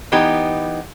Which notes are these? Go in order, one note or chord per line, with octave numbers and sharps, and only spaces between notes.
E3 B3 D#4 G4